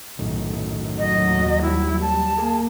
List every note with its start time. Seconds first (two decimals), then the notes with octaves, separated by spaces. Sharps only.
0.19 B1 F#2 A2 D#3
0.98 D#2 F#3 D#5
1.62 G3 E4
2.01 A5
2.37 A#3 G#4